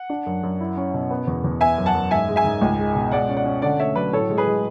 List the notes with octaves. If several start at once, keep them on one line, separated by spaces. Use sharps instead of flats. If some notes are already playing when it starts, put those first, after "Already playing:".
Already playing: F#5
D4
F#2
F#2
E4
C#4
B2
B3
E2
E2
B3 E5 G#5
F#2
F#5 A5
F#2
G#2 E5 G#5
G#3
E5 G#5
G#2
C#2
G#3
B2
G#3 D5 F#5
C#4
D5 F#5
C#4
D3 D5 F#5
A3 C#5 E5
F#3 B4 D5
A2 A4 C#5
G#3
G#4 B4
G#3